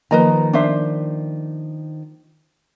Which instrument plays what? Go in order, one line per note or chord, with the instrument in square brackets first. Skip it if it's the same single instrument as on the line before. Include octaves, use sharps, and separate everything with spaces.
[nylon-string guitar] D#3 F3 A#3 [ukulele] B4 D#5 A#5
[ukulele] D4 C5 E5